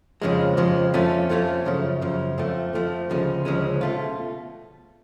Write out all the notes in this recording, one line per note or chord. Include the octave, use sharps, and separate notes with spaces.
F2 C#3 F3 G#3
F2 C#3 F3 G#3
F2 F3 A3 C#4 F4
F2 F3 A3 C#4 F4
F#2 C#3 F3
F#2 C#3 F3
F2 F3 A3
F2 F3 A3
D2 C#3 F3 G#3 C#4
D2 C#3 F3 G#3 C#4
B2 A3 F4